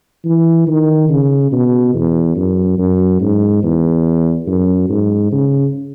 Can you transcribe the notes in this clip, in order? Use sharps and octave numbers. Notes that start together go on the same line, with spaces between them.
E3
D#3
C#3
B2
E2
F#2
F#2
G#2
E2
F#2
G#2
C#3